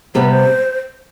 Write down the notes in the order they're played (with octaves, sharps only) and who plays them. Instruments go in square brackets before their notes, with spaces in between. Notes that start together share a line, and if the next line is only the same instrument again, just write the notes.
[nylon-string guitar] C3 G3 B3 [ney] C5
[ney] B4
C5